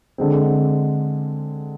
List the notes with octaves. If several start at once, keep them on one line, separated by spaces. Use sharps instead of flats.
D3 G#3 C4